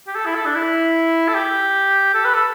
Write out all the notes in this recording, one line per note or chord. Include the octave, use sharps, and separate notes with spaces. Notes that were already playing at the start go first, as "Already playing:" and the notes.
G4
A4
E4
A4
D4
E4
A4
G4
A4
B4
A4